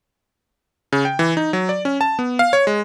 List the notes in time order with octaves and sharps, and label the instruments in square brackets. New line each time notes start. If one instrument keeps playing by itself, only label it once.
[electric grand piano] C#3
G5
E3
D#4
F#3
D5
C#4
A5
B3
F5
C#5
G#3